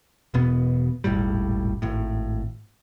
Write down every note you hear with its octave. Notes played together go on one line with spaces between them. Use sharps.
E1 B2 B3
D#1 G#1 A2 G3
G#1 A2